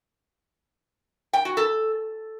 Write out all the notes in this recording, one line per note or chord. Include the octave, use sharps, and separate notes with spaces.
G5
F#4
A4